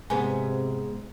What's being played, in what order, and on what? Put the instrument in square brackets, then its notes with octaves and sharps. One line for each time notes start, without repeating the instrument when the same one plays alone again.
[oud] G#2 B3 [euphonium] C3 [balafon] G#5